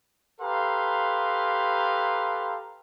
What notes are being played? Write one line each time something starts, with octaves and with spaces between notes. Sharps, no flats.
G4 A4 B4 F5 A#5 C6